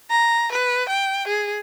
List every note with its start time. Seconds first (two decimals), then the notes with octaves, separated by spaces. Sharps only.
0.10 A#5
0.52 B4
0.89 G5
1.28 G#4